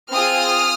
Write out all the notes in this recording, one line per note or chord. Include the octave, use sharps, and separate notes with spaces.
C4 F4 G#4 D#6 F6